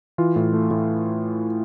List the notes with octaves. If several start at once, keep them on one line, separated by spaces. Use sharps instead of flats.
E3 F4
A2
A3
A2